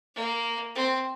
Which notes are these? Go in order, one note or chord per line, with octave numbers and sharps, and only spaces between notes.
A#3
C4